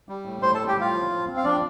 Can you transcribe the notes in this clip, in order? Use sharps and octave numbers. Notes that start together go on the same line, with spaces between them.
G3
A2
A2 C5 C6
A4 A5
G3
G4 G5
A2 F4 F5
F3
F3
C4
F5
F3 D4 D5